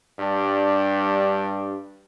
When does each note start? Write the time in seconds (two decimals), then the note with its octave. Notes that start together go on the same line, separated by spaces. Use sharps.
0.18 G2 G3 D4